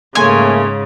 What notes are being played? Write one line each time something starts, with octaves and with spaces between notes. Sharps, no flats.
G#2 C#3 A3 A#3 C#5 G#5 C6